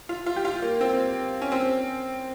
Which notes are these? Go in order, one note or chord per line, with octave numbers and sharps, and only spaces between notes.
F4
F4
G4
F4
A#3
C4
C#4
C4